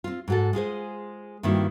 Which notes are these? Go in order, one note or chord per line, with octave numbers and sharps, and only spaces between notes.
C4 F4
G#2 F#4 A4
G#3 F4 G#4 C5
G2 D#3 A#3 C4 E4 F#4